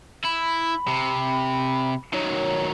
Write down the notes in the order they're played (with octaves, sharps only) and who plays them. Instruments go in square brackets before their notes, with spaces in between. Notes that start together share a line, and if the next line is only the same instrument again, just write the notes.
[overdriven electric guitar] E4 [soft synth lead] B5
[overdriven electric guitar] C3
[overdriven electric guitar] D#3 F#3 [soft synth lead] C#5